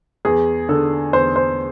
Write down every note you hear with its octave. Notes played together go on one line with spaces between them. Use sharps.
E2 G#4
D3 A4
E2 C5
C5